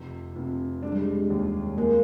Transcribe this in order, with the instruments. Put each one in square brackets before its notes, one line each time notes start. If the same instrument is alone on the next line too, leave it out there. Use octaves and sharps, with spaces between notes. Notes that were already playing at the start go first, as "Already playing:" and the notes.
Already playing: [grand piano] F1 C3
F1
[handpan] G#3 [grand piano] D4
[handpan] G3
G#3
[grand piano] D#2
[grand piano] G#3 [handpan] A#3